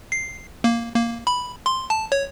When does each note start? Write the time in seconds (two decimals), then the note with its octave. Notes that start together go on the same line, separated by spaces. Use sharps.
0.12 C7
0.64 A#3
0.95 A#3
1.27 B5
1.66 C6
1.90 A5
2.12 C#5